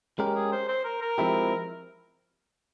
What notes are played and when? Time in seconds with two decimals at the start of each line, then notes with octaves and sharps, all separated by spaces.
0.19 G#3 C#4 G4 A#4
0.36 G#4
0.52 C5
0.69 C5
0.85 A#4
1.02 A#4
1.18 F3 G#3 C4 E4 G4